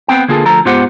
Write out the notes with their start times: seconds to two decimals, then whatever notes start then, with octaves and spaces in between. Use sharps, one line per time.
0.08 B3 C4 G5
0.28 D3 A#3 F4 G#4 A4
0.45 D2 F3 A4 A#5
0.65 G#2 B3 F4 G4 C5 F#5